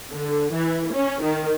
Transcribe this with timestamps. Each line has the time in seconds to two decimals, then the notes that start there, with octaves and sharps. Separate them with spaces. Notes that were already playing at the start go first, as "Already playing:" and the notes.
0.13 D3
0.54 E3
0.94 C#4
1.23 D#3